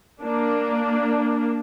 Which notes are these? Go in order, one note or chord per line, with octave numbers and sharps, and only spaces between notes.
A#3 D4